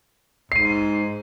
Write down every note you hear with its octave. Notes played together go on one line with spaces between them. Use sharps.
G#2 C7 D#7